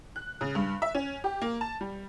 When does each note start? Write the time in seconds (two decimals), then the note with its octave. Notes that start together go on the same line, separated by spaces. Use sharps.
0.16 F#6
0.41 C#3
0.55 G2
0.82 E5
0.95 C#4
1.24 G4
1.42 A#3
1.61 A5
1.81 G3